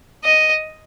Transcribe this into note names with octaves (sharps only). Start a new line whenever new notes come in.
D#5